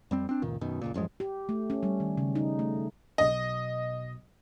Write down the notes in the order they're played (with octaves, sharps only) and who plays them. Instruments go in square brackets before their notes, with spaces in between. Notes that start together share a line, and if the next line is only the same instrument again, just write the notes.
[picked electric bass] F2 G3 C4
C4 D4
F#1 C#2 A#2 D#3
F#2 B2 D#3
F#1 C#2 A#2
A1 F#2 F3 G#3
[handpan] G4
A3
C#4
G3
D#3
C#3
D#4
A3
[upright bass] B1 B2 [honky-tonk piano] D#5